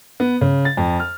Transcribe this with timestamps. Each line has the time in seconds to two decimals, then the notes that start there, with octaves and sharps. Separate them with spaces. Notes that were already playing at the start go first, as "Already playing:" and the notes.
0.20 B3
0.41 C#3
0.65 A6
0.77 F2
1.00 F6